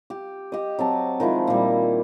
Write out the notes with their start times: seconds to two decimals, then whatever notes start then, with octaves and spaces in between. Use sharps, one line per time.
0.10 G4
0.52 G4 D#5
0.79 F#3 C4 A5
1.20 D#3 F3 G#3 E4
1.47 A#2 G3